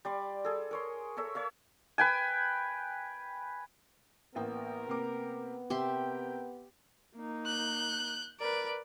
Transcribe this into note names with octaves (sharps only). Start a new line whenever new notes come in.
G3 D5 C6
G#4 A4
A#4 C#5 C6
A4 A#4 C#5 E5
C#5 E5 F5
B4 G5 G#5
A1 A#3 B3 A#4 G5
C3 A#3 D6
C3 G4 A#4 E5 G5 C6
A#3 D#4
F#6 G6
A#4 B4 D5